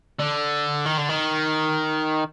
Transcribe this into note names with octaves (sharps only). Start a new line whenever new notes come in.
D3
D#3
D3
D#3